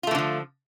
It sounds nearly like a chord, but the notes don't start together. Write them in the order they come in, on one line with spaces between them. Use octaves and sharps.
F4 A3 E3 D3 F3